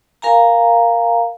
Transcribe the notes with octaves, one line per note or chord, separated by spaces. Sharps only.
A#4 F5 G#5 A#5